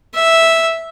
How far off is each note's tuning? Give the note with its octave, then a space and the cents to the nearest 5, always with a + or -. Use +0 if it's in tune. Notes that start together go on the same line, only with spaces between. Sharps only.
E5 -5